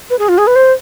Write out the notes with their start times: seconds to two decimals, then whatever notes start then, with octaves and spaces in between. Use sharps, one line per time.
0.10 B4
0.19 G#4
0.29 F4
0.38 G#4
0.47 B4
0.56 C5